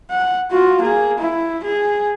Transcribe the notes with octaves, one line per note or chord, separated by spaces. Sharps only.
F#5
F4 F#4
A#3 G#4
E4
G#4